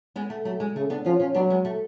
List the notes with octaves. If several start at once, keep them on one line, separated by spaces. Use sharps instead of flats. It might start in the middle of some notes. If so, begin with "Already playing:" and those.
G#3 B3
A3
F#3 A3
G#3
C#3 A3
B3 D4
F3 C#4 F4
C#4 F4
F#3 B3 D4
G#3 B3
A3